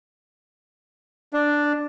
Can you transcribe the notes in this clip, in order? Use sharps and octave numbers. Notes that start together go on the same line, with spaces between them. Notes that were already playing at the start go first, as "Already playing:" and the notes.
D4